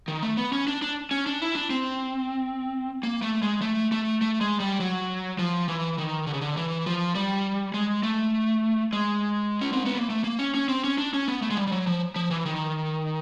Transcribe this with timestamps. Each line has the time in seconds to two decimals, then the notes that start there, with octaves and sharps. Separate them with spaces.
0.08 D#3
0.23 A3
0.37 B3
0.52 C#4
0.68 D4
0.82 D4
1.11 C#4
1.26 D4
1.42 E4
1.55 D4
1.70 C4
3.03 A#3
3.22 A3
3.42 G#3
3.61 A3
3.92 A3
4.21 A3
4.41 G#3
4.60 G3
4.80 F#3
5.39 F3
5.68 E3
5.98 D#3
6.27 D3
6.34 C#3
6.41 D3
6.57 E3
6.86 F3
7.15 G3
7.74 G#3
8.03 A3
8.93 G#3
9.61 C#4
9.73 C4
9.85 B3
9.97 A#3
10.10 A3
10.24 A#3
10.39 C#4
10.54 C#4
10.69 C4
10.84 C#4
10.98 D4
11.14 C#4
11.28 B3
11.42 A3
11.51 G#3
11.57 G3
11.67 G3
11.72 F#3
11.87 F3
12.16 F3
12.31 E3
12.46 D#3